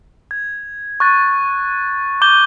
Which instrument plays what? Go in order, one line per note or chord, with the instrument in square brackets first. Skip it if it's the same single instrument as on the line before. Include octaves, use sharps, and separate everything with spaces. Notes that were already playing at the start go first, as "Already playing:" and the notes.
[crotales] G#6
C#6 F#6 A6
C#6 D6 G6 G7